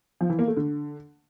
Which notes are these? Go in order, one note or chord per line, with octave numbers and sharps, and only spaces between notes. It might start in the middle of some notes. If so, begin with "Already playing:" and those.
F3
E3
A#3
A3
D3